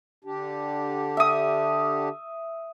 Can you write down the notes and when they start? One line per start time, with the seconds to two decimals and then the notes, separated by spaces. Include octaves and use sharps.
0.24 D3 D4 G4
1.17 E5 D#6